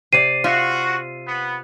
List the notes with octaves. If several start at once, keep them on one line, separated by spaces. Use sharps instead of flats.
C3 D5 C7 D#7
F4 F#4 E5
B3